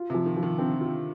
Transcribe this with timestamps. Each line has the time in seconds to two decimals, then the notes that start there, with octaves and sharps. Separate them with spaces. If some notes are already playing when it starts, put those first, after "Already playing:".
Already playing: F4
0.10 C3
0.14 F3
0.26 D#3
0.37 F3
0.43 D#3
0.59 D3 C4
0.81 F4